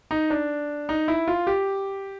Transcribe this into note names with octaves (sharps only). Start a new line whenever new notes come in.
D#4
D4
D#4
E4
F4
G4